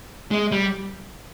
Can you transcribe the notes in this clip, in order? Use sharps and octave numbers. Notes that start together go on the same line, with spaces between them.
G#3
G3